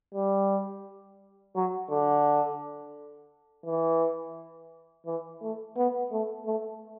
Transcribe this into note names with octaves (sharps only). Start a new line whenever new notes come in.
G3
F#3
D3
E3
E3
A3
B3
A3
A3